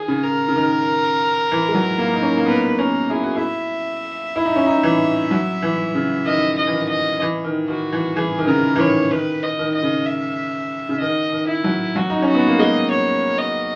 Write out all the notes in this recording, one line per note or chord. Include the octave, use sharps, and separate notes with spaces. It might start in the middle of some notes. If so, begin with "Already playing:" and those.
Already playing: D#3 G#4
C#3
A#4
C#3
D#3
E3
G#3
F#3
A#3
D#4
C#4
A#3
B3 B4
C#4 A#4
E4 G#4
F#4
E4
E5
E4
D#4
C#4
D#4
E3
F#3
E3
C#3
D#3 D#5
D#5
E3
D#3
D#5
E3
D#3
D#3 F#4
E3
E3 G#4
D#3
C#3 A#4
E3
D#3 C#5
D#3 B4
D#5
D#3
D#5
C#3
E5
C#3
D#3 D#5
D#3
E4
F#3
F#3 F#4
D#4
C#4
F#4
B3
A#3
G#3 D#5
C#5
D#5